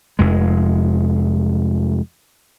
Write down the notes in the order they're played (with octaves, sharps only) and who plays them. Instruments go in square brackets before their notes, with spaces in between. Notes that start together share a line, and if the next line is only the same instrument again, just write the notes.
[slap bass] F1 F2 G#3